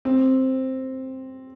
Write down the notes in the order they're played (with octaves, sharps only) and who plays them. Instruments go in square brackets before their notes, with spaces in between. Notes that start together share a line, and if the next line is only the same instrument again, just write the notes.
[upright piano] C4